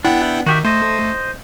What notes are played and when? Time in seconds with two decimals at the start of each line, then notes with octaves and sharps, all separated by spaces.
0.04 B3 D4 E4 F#5 G5
0.46 D#3 F#4 G4 E5
0.65 A3 C5 D#5